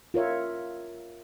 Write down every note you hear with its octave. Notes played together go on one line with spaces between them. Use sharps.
F4 A#4 C#5 E5